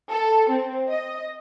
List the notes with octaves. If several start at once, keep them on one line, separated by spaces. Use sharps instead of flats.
A4
C4
D#5